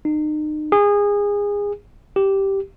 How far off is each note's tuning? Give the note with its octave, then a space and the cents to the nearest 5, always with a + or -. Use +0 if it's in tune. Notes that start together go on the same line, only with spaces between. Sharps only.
D#4 -35
G#4 -25
G4 -5